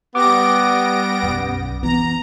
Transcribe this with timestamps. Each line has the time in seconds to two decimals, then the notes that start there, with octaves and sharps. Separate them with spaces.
0.15 G3 B3 D6 A#6 D7
1.23 B1 F#2
1.83 E3 B3 A#5